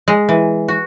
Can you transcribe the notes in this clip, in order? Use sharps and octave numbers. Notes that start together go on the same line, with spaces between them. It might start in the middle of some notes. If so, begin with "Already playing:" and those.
G#3
E3
F#4